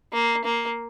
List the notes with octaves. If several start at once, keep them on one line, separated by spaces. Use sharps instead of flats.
A#3
A#3